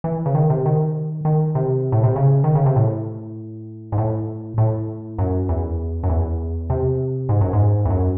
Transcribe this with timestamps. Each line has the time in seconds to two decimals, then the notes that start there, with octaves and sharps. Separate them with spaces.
0.04 E3
0.26 C#3
0.35 D#3
0.50 C3
0.66 D#3
1.25 D#3
1.55 C3
1.92 A2
2.03 C3
2.16 C#3
2.44 D#3
2.55 C#3
2.66 C3
2.76 A2
3.92 G#2
3.98 A2
4.58 A2
5.19 F#2
5.49 E2
6.03 F#2
6.09 E2
6.70 C3
7.29 G#2
7.41 F#2
7.53 G#2
7.85 E2
7.90 F#2